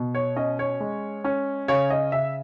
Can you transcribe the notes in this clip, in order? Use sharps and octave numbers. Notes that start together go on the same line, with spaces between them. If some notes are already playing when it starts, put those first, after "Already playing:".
Already playing: B2
C#5
C#4 D#5
C#5
G#3
C#4
C#3 C#5
D#5
C#3 E5